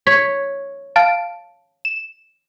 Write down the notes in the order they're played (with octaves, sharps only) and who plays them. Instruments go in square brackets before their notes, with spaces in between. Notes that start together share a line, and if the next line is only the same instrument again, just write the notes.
[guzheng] C#5 [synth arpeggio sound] B6
[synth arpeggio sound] F5 A5 D7
E7